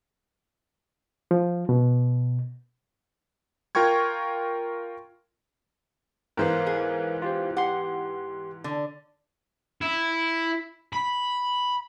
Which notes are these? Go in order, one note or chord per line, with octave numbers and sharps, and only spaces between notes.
F3
B2
F4 A#4 G5 C#6 G#6
G#2 E3 B3 A#4 C5 F5
G#4
F4 G4 C5
G4 F#5 C6
D3
E4
B5